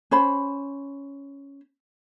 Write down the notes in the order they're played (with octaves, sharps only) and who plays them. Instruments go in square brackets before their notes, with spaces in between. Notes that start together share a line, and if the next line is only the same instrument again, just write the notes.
[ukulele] C#4 C5 B5